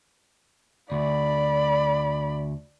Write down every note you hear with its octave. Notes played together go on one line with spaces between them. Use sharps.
D2 D5 B5